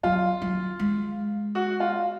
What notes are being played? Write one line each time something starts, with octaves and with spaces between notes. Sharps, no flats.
F#3 F4
F#3
G#3
F#4
F4